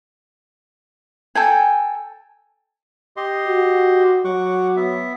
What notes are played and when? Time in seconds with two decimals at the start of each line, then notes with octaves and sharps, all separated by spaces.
1.35 A4 G5 G#5
3.17 G4 D#5 C6
3.47 F#4
4.25 F#3 F#5 C#6 D6
4.77 B3 E5